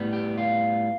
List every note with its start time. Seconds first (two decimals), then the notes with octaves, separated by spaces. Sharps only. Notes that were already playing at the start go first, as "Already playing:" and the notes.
Already playing: A2 G3 B3
0.13 G4
0.38 F4